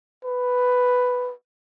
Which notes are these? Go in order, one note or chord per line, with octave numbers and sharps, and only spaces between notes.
B4